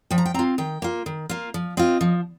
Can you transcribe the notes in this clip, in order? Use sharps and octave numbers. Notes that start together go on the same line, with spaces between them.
F3 G5
A#5
G5
C4 F4 A#5
D#3 G5
A#3 F4
D#3
A#3 F4
F3
C4 F4 D#5
F3